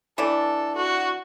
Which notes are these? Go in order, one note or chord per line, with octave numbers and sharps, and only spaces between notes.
E3 A3 D4 A4
F#4